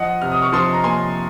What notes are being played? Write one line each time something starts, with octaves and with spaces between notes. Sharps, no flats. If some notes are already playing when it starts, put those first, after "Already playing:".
Already playing: F3 D#5 F#5
C3 F6
D#6
C#6 F6
F3 C6 D#6
A#5
A#3 G#5 C6